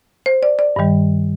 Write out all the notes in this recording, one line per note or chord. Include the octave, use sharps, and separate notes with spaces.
C5
D5
D5
G2 D#3 G3